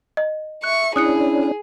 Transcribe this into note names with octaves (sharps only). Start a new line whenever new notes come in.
D#5
E5 C#6 F#6
C#4 D4 E4 G#4 D#6 F#6 C#7